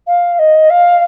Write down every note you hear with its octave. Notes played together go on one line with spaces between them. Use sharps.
F5
D#5
F5